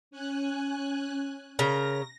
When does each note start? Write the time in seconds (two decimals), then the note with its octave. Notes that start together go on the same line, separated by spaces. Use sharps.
0.11 C#4 G#5 F#6
1.59 C#3 A#4 A#6